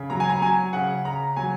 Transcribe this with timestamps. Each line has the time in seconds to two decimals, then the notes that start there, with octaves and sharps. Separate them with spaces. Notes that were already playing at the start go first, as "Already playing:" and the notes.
Already playing: C#3
0.10 F#3 A#5
0.20 G#5
0.30 A#5
0.41 F#3 G#5
0.73 C#3 F#5
1.05 C#3 A#5
1.36 F#3 G#5